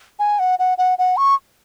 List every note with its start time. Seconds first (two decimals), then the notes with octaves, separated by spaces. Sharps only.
0.19 G#5
0.39 F#5
0.59 F#5
0.78 F#5
0.98 F#5
1.17 C#6